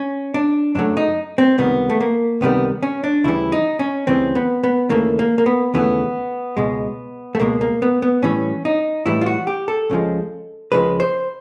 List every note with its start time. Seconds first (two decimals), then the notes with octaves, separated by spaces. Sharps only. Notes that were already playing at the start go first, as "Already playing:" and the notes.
Already playing: C#4
0.34 D4
0.75 F#2 C#3 F#3 A3 D4
0.97 D#4
1.38 C4
1.58 C#2 C3 D#3 G3 B3
1.90 A3
2.00 A#3
2.41 C#2 C3 D#3 G3 B3
2.83 C#4
3.04 D4
3.24 D2 C#3 E3 G3 E4
3.52 D#4
3.79 C#4
4.07 D2 C#3 E3 G3 C4
4.35 B3
4.64 B3
4.90 D#2 C#3 E3 A3 A#3
5.19 A#3
5.38 A#3
5.46 B3
5.74 D#2 C#3 E3 A3 B3
6.57 C#2 B2 G#3
7.35 A3
7.40 C#2 B2 G#3 A#3
7.61 A#3
7.82 B3
8.02 B3
8.22 A2 E3 G3 C#4
8.65 D#4
9.06 A2 E3 G3 E4
9.21 F4
9.26 F#4
9.47 G4
9.68 A4
9.90 C#2 C#3 F3 G#3
10.72 C#2 C#3 F3 G#3 B4
11.00 C5